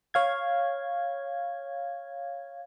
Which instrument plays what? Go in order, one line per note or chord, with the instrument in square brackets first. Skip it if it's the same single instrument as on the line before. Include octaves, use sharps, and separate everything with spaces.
[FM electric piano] C#5 F5 G#6